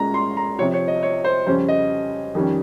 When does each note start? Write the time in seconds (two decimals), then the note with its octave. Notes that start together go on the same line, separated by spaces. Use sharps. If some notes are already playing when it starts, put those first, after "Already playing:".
Already playing: A#2 G#3 C#4 A#5
0.14 C6
0.37 A#5
0.59 C3 F3 C4 C#5
0.74 C#5
0.88 D#5
1.03 C#5
1.24 C5
1.46 F2 C#3 G3 C#4 C5
1.68 D#5
2.35 F2 D#3 G3 C#4